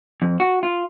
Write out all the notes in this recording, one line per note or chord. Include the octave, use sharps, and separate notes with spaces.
F2
F#4
F4